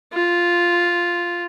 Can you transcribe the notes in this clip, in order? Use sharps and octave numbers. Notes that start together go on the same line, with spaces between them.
F4